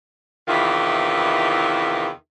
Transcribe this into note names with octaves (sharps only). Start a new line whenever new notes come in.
E2 C3 D#3 E3 F4 E5